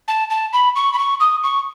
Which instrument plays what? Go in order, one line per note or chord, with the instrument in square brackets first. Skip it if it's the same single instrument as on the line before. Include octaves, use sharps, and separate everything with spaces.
[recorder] A5
A5
B5
C#6
B5
C#6
D#6
C#6